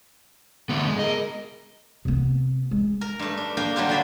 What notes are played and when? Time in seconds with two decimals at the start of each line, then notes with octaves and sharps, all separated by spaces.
0.69 D2 D3 A3 B3
0.87 G#3
0.99 G#4 A#4 D#5
2.05 C3 B3
2.71 G#3
3.01 A#4
3.19 G2 A3
3.37 D4
3.57 A#3 D4 A#4 F5 G5
3.76 D3 F#3 G3 C5 F5
3.89 D4 F#4 G#4 D5 F5 B5